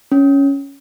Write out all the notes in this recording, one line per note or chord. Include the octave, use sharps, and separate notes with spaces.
C#4